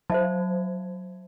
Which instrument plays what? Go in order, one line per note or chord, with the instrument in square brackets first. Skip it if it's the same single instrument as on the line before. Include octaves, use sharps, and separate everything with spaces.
[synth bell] F#3 [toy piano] C5 E5 A5